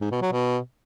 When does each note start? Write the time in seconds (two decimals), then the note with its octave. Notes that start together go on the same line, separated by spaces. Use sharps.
0.01 G#2
0.11 B2
0.22 F#3
0.32 B2